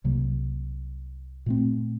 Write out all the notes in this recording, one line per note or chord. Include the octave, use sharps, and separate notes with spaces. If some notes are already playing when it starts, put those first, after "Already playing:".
C2 C3 F#3 A#3
A#2 A3 C4